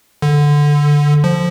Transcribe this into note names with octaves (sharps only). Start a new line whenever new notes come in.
D3
F3